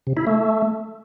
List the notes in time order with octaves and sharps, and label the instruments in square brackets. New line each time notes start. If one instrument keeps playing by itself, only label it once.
[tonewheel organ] C3
E4
A3